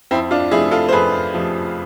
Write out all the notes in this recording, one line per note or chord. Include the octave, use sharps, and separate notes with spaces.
F2 C4 E4
D4 F4
C3 F3 A3 E4 G#4
F4 A4
C5
F2 G#4 B4
C3 F3 A3